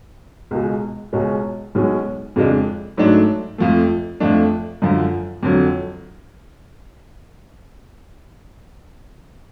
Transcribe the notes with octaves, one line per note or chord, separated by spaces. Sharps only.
C#2 B2 G#3
C#2 B2 G#3 C#4
B1 B2 G#3 C#4
F2 C#3 G#3 D4
G#2 F#3 A3 D4
F2 F3 A3
F2 F3 A3 D4
F#2 D3 F3
F2 D3 F#3